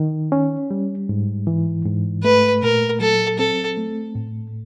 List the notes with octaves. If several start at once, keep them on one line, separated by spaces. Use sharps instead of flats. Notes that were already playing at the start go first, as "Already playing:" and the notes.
Already playing: D#3
C#4
G3
G#2
E3
G#2
A3 B4
A#2 A#4
F#3 A4
C4 A4
A3
A2